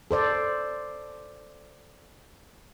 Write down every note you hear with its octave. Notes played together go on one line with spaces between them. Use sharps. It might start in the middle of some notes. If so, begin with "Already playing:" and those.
A4 C5 D5